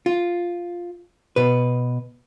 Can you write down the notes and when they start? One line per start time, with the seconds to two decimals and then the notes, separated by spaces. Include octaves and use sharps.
0.06 F4
1.36 B2 B4